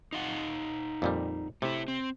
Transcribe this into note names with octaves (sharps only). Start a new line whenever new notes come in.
D#4 F5 F#5
F2 A#2 G3
C3 A3 E4
C4